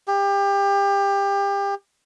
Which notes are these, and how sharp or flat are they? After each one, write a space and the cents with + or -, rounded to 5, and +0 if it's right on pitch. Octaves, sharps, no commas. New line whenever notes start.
G4 +25